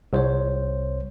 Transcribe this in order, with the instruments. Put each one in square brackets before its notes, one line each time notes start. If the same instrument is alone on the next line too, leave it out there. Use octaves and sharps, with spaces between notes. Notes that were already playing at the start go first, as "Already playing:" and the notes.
[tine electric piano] C2 C5 C#5